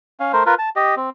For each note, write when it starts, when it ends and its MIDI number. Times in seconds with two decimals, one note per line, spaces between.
0.20 0.32 61
0.20 0.32 77
0.33 0.43 57
0.33 0.43 70
0.33 0.43 72
0.46 0.54 65
0.46 0.54 70
0.46 0.54 71
0.59 0.69 81
0.76 0.95 67
0.76 0.95 75
0.97 1.10 60